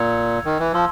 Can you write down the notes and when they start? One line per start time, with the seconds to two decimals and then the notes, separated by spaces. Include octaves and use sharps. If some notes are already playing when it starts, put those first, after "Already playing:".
Already playing: A#2 E6 G#6 C#7 F7
0.45 D#3
0.60 E3
0.73 F3 A5 C6 E6